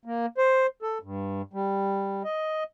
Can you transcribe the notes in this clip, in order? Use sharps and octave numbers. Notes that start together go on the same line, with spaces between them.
A#3
C5
A4
G2
G3
D#5